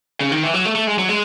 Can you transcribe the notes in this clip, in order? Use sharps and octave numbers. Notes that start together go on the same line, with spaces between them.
C#3
D#3
E3
F#3
A3
A3
G#3
F#3
G#3